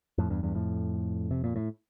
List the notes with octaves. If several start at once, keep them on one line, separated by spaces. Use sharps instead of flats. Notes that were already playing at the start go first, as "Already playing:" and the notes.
F2 A2
E2 G2
E2 G2
F2 A2
C3
A#2
A2